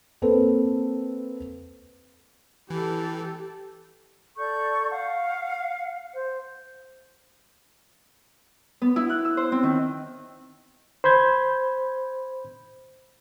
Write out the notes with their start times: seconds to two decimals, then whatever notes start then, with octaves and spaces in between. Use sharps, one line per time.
0.22 A#3 C4 A4 B4
2.70 E3 G4 A4
4.38 A4 D5 C#6 G6
4.91 F5 F#5
6.13 C5
8.82 B3
8.96 E4
9.10 F#6
9.25 E6
9.37 C5
9.52 C4
9.63 D#3
11.04 C5 B5 G6 G#6